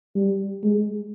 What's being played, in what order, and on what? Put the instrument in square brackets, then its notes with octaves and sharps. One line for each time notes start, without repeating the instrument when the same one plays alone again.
[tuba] G3
G#3